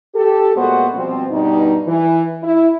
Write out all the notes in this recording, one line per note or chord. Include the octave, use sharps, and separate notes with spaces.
G4 A4
A#2 G#3 A3 B3 F#4 C5
B2 F3 G3 C4
G2 B2 G3 D#4
E3
E4